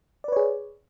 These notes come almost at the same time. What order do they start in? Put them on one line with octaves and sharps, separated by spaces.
D5 B4 C#5 G#4